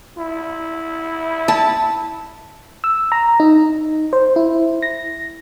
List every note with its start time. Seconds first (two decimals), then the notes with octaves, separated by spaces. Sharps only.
0.18 E4
1.48 A5
2.84 E6
3.12 A#5
3.40 D#4
4.13 C5
4.36 E4
4.82 A#6